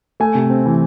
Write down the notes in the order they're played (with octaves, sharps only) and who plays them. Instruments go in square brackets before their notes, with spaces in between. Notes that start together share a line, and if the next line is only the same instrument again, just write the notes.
[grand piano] A3 G#5
C3
C4
E3